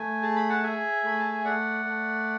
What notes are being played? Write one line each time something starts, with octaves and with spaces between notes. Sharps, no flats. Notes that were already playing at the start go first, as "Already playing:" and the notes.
Already playing: A3 G#5
G#4 A5
B5
F#5 A5
G#4 E5 G#5
A3 B5
A5
G#5
A3 D5 F#5
A3